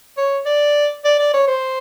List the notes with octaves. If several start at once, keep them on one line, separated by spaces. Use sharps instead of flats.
C#5
D5
D5
D5
C#5
C5